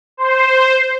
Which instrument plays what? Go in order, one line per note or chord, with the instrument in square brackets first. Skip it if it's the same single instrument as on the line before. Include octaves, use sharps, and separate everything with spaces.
[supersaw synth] C5